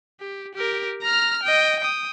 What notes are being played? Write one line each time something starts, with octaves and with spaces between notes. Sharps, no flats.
G4
G4 A#4
A#5 F6
D#5 G5
G5 D#6